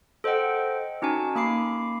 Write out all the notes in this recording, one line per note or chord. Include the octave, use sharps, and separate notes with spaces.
A4 C5 D#5 F#5 G5
C#4 D#4 F#4 G#5 A5
A#3 B5 D6 C7